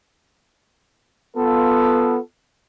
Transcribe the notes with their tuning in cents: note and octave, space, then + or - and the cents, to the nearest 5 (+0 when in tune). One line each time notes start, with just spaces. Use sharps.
B3 +0 F4 +0 A4 +0